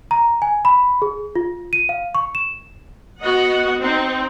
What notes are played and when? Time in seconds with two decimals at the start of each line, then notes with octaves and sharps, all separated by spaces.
0.11 A#5
0.42 G#5
0.65 B5
1.02 G#4
1.35 F4
1.73 D#7
1.89 F5
2.15 C#6
2.35 E7
3.21 B3 F#4 D#5 F#5
3.78 C4 D#4